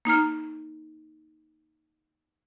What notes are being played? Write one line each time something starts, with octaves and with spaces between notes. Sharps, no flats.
A#3 D#4 A#5 F6